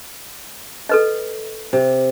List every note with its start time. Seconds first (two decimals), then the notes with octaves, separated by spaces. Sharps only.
0.89 A4 B4 D#5
1.73 C3